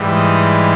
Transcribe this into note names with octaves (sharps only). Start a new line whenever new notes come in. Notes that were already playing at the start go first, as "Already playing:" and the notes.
Already playing: G#2 E3 G3
D#5